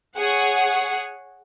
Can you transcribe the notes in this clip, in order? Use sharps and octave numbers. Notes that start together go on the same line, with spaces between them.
G#4 C#5 F#5